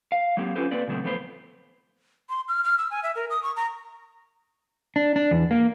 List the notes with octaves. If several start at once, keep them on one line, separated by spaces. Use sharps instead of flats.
F5
F#3 A#3 C4 G4
C#4 F4 G4 A4 B4 C5
A#3 C4 B4 D5
A#2 C#3 F#3 A3 B3 C4
E2 F3 A3 B3 B4 C5
C6
F6
F6
E6
G#5
E5
A#4
D#6
C#6
A#5
D4
D4
E2
A#3